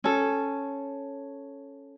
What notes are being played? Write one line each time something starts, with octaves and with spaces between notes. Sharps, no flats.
C#4 A4